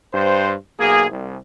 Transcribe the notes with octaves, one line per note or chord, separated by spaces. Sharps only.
G2 C5
B1 A#3 G#4
C2